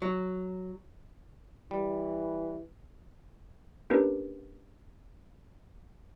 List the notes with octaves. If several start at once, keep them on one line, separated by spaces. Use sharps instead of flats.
F#3
E3 G3
A#3 C#4 D4 G4 A#4 B4